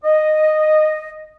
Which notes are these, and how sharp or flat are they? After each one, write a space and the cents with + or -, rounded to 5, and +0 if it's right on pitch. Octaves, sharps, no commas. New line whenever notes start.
D#5 -10